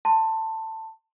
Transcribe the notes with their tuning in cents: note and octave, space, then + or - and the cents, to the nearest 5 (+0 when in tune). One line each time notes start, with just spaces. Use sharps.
A5 +15 C6 +0